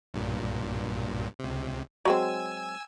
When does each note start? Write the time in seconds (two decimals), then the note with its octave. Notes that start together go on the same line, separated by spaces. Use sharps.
0.14 B1 G2 A#2
1.39 C#2 C3
2.05 F#3 G#3 C4 G#5 E6